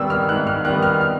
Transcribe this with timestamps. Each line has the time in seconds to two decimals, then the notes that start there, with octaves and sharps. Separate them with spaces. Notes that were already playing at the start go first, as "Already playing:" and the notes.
Already playing: G#2 D#3 G3 B3 E6
0.10 F6
0.29 G#2 F#6
0.47 F6
0.65 D#3 G3 B3 F#6
0.83 F6
1.01 F6